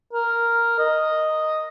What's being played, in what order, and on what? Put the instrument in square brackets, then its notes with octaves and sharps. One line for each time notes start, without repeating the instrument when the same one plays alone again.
[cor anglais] A#4
D#5